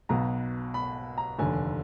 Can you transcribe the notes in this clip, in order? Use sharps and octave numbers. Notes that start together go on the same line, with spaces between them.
B1 B2 A#5
B5
A#5
F1 D#2 D3 G#5